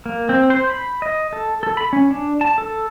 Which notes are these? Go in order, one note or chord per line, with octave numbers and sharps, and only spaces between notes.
A#3
C4
C5
B5
D#5
A4
A4
B5
C#4
D4
A5
A4